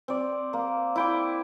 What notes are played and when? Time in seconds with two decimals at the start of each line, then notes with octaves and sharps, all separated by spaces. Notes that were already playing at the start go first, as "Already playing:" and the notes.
0.08 C4 D5
0.53 A#3
0.96 E4 G5 D6